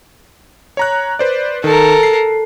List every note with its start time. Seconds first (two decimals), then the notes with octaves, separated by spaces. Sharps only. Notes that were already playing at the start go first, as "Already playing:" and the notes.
0.77 C#5 A#5 F#6
1.19 B4 C5 D5
1.64 D#3 A4 A#4
2.03 C7